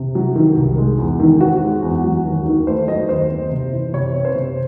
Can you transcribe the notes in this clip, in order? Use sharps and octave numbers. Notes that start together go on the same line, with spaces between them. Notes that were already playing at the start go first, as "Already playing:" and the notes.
Already playing: C3
F#3
D#3
C2
G#3
E2
D#3
C4 F#4
G#3
E2
F#3
D#2
D#3
A3 C5
F#3 D#5
D#2 C5
C4
C3
E3
C3 C#5
C4
C5
C3